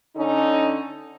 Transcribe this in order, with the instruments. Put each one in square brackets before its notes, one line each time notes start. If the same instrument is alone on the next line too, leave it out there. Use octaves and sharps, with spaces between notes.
[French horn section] D3 C#4 D#4